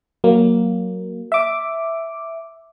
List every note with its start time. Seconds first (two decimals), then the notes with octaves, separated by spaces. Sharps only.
0.24 F#3 A#3
1.32 E5 D6